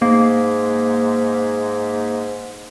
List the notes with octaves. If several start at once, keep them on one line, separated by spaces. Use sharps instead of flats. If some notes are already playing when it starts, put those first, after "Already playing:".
G#2 A#3